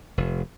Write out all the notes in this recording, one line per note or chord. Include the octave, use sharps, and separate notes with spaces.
F1